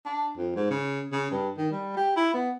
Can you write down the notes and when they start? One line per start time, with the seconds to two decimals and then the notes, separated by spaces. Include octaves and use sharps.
0.06 D4
0.37 F2
0.56 G#2
0.70 C#3
1.12 C#3
1.31 G2
1.57 D#3
1.71 G3
1.97 G4
2.16 E4
2.34 B3